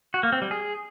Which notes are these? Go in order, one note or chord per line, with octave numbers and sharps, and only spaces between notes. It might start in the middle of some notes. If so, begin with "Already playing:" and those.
F#4
A#3
C4
G3
G#4